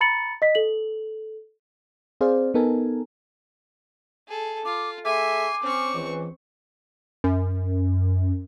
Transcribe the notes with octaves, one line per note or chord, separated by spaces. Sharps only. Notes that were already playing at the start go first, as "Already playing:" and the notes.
A#5 B5 A6 C#7 F#7
D#5 B6
A4 F#7
C4 G#4 C5 D5 F5
B3 D#4 A4 A#4 G#5
G#4 A4
F4 D6
A3 G#4 E5 G#5 C6 D6
C4 C#4 C#6
C#2 E3
F#2